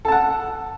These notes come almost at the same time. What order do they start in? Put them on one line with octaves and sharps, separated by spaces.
A4 A5 F#5